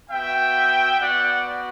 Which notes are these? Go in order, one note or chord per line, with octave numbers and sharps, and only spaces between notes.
B3 F#4 E5 G5
B3 F#4 D5 F#5